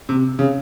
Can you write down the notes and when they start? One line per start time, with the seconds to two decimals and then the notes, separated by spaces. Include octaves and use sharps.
0.09 C3
0.39 C#3